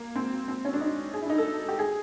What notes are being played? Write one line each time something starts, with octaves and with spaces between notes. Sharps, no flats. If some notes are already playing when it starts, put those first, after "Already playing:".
Already playing: A#3
C4
C4
C#4
D4
D#4
G#4
E4
D4
D#4
A4
G4
G#4